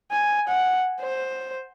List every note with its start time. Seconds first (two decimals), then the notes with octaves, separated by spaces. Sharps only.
0.11 G#5
0.48 F#5
1.01 C5